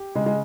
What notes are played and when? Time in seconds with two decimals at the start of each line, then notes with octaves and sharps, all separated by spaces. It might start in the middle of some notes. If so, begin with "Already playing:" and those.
Already playing: G4
0.15 C#3 G#3
0.26 G#3